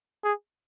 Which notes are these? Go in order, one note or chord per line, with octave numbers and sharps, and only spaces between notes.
G#4